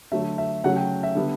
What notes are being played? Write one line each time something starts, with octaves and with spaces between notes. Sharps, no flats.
D3 F#3 A3 E5
E5
C#3 F#3 A3 F#5
G5
E5
D3 G3 B3